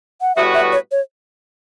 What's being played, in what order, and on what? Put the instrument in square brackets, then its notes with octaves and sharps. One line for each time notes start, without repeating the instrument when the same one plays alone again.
[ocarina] F#5
[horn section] A2 G3 B3 F#4 B4 [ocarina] E5
[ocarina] E5
C#5
C#5